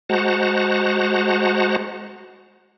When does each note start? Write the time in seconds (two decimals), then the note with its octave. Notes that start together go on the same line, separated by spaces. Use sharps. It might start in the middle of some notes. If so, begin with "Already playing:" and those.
0.09 G#3 F#4 C5 F#5 A5 A#5